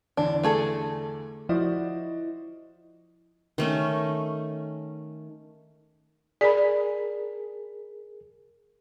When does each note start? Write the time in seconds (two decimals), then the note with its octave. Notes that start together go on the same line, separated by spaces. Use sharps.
0.17 E2 D3 E3 D4
0.43 A3 G#4 A4
1.49 F3 E4 F#4 C5 D5 D#5
3.58 D#3 A3 C#4
6.41 G#4 A#4 D5 B5